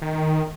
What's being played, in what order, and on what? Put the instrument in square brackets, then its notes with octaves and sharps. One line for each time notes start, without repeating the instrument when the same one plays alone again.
[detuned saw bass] D#3